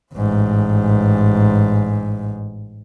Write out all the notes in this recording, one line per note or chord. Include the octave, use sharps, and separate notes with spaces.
A1 G#2